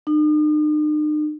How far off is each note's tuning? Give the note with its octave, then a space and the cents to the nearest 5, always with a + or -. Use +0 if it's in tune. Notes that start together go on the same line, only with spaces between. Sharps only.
D#4 -45